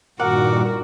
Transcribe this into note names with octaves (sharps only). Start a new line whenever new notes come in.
G2 A#2 D#3 F#4 A#4 F#5 D6